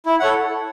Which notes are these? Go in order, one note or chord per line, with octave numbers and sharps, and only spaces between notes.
E4
A4 C#5 F#5